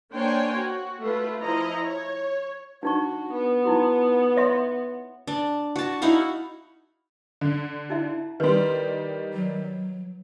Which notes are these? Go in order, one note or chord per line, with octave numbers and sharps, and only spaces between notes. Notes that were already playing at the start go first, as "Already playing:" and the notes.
A#3 D4 C5 C#5 G5 G#5
F#4
A3 F4 B4
F3 E4 D#5 A#5
C#5
D4 D#4 F#4 C#6
B3
D#4 E4 F#4
C#5 E5 C6
D4
F#4 A5
D#4 E4 F#4 F5
D3
D#4 E4 E5
D#3 G3 B4 C6
F#3